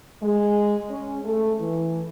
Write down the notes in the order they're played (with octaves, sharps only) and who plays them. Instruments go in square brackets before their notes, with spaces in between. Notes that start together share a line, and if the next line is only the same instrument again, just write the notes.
[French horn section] G#3
C#4
A3
E3